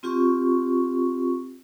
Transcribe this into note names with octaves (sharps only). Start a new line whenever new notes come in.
C4 F4 G4 C#6